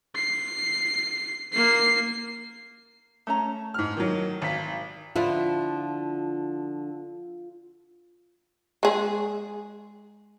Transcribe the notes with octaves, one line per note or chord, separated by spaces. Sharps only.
C7
A#3 C7
A3 C#4 A#5
G#2 F6
D#3 F#3
G#1 B6
D3 F3 E4 F4
G#3 G#4